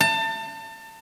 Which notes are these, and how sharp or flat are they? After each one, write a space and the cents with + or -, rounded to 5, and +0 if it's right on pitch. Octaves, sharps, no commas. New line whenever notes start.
A5 +30